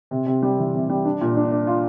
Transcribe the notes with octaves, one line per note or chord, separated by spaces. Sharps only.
C3
C3
G3
E3
C3
G3
D4
A#2
D4
D4
F4